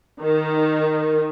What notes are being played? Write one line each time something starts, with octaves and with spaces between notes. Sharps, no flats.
D#3